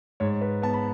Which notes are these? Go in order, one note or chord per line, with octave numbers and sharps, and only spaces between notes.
G#2 C#5
B4
B3 A5
B5